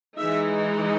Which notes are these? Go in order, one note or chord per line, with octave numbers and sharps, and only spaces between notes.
E3 G#3 D#4 E5